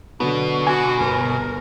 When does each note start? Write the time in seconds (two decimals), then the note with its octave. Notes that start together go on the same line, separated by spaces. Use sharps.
0.20 B2 D3 F#3 B3
0.67 F#4 G#5
1.00 G1 A#4